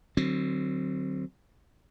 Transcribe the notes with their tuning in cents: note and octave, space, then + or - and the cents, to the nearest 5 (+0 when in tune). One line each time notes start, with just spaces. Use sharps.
D3 +45 F#3 +15 C4 +0